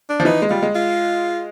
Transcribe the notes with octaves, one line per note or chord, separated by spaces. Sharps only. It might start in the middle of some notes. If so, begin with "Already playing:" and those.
D4
F3
E3 D#4
G#3
G3 F4
G#3
F4